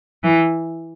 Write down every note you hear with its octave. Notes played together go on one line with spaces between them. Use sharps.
E3